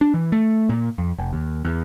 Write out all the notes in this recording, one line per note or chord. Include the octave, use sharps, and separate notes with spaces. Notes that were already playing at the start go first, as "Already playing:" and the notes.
D4
E3
A3
A#2
F2
F1
D#2
E2